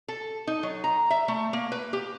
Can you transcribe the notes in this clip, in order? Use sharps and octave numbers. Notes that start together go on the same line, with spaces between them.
A4
D#4
F#3
A#5
E5
A3
A#3
B4
G4